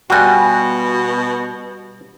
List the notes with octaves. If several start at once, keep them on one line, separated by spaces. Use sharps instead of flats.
B2 G3 F4 F#4 G#5